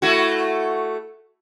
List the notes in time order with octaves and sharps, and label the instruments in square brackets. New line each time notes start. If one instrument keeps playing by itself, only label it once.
[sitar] A3 E4 F#4